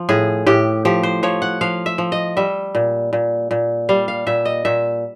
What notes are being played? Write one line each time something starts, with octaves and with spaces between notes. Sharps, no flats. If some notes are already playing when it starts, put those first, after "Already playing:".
Already playing: F3
A2 G#4
A2 G4
F3 G4
C5
F3 C#5
F#5
F3 F5
E5
F3
D#5
G3 E5
A#2
A#2
A#2
G3 F5
F5
A#2 E5
D#5
A#2 E5